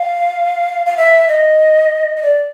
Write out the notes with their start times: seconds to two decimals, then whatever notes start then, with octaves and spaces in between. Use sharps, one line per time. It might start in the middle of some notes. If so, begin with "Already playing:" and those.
Already playing: F5
0.86 F5
0.97 E5
1.28 D#5
2.16 D#5
2.22 D5